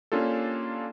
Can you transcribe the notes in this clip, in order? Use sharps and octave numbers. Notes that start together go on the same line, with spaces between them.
A#3 C#4 D4 F4 G4 A4